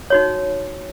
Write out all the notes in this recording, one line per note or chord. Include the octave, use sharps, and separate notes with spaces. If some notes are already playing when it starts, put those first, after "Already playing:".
D#4 F#4 C#5